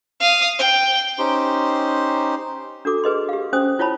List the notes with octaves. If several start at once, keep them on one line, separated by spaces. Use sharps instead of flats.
F5 D#6
G5
C#4 D#4 G4 C5 C6
D4 F#4 A4 D6
G#4 B4 D#5 C6
G4 F5
C#4 C5 G#5 D#6
E4 F4 C#5 A5 B5